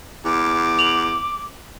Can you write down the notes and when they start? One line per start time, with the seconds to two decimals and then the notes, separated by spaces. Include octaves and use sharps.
0.25 E2 D6
0.79 F7 F#7